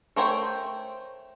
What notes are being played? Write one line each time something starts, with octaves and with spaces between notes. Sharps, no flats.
A3 A#4 C5 C#5 G5